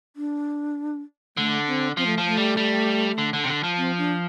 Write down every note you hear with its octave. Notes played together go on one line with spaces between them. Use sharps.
D4
D3 A3
C4
F3 C4
A3
F3
A3
G3
G3
D3
D3
C3
D3
F3
C4
D4